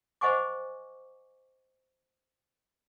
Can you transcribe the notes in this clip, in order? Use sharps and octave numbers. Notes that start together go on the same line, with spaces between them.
C5 D#5 F#5 G#5 C#6 D6